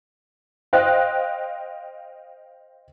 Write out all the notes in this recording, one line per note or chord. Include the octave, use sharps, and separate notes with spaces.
C5 D#5 F5 G5 F#6